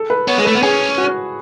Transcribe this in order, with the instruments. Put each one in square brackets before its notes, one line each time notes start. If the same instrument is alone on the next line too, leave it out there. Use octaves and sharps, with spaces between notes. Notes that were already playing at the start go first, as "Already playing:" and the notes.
Already playing: [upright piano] A4
B4
[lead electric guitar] B3 [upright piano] C#5
[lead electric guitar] G#3
[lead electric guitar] A3 [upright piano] B4
[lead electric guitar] B3
[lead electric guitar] C#4 [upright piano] G#4
[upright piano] F#4